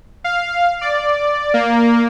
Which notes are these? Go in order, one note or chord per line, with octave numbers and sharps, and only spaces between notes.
F5
D5
A#3